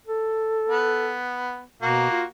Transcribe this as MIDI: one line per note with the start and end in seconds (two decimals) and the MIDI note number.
0.07 1.16 69
0.69 1.62 59
1.82 2.06 47
1.82 2.24 58
1.82 2.24 66
1.82 2.24 70
2.11 2.24 65